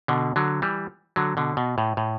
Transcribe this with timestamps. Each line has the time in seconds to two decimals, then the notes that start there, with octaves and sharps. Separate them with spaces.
0.08 B2 D3
0.36 D3 F#3
0.62 E3 G3
1.16 D3 F#3
1.37 B2 D3
1.57 B2
1.78 A2
1.97 A2